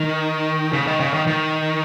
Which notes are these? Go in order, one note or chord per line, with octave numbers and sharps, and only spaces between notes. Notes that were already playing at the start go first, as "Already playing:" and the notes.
Already playing: D#3
C#3
D#3
C#3
D#3
D#3